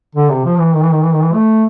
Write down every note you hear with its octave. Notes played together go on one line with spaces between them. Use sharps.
D3
C3
F3
E3
D#3
E3
D#3
E3
D#3
E3
A3